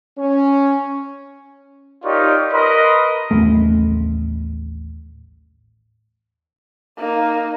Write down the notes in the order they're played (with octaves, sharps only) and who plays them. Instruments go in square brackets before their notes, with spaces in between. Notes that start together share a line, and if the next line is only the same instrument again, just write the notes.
[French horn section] C#4
[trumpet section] D#4 F4 G4 A#4 C#5 D5
A#4 B4 D#5 B5 C6
[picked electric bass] A1 D#2 A3
[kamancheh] A#3 D#4